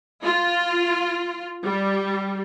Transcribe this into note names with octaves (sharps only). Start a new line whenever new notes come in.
F4
G3